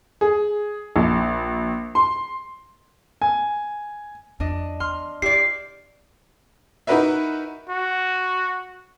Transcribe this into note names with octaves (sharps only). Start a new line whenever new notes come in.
G#4
A#1
C6
G#5
F2 D4 D#5
E2 C6 F6
D4 E4 G4 D5 C7
D#4 E4 F#4 A#4 B4 E5
F#4